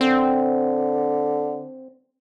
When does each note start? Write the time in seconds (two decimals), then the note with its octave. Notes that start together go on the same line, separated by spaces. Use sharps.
0.01 D3 C4